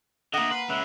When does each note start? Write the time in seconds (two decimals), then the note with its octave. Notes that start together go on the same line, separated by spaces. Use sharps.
0.34 D3 A3 A#3 D#5 F#5
0.51 B4 C6
0.69 C#3 G#3 B4 E5